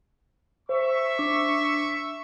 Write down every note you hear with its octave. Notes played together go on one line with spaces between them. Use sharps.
C5 E5 C#6
D4 D6